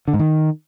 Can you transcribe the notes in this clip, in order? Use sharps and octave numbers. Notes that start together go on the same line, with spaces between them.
D3
G#2
D#3